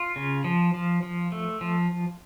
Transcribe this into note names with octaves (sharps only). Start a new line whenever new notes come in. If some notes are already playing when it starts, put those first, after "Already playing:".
Already playing: F4
C#3
F3
F3
F3
A3
F3